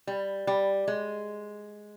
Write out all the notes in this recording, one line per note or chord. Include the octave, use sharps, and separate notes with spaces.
G3
G3
G#3